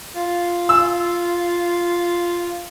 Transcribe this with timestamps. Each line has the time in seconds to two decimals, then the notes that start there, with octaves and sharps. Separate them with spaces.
0.15 F4
0.69 E6